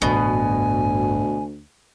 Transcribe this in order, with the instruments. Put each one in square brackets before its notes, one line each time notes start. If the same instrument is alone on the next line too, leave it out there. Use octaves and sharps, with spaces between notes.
[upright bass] A1 G2 [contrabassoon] D2 [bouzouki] B2 [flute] G#5